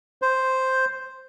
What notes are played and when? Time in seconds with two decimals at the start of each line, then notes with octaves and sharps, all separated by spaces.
0.22 C5